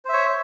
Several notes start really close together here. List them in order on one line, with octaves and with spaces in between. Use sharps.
C5 E5 C#5